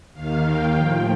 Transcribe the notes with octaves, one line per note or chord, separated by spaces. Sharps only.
D#2 D#3 F5
G5
A2 F3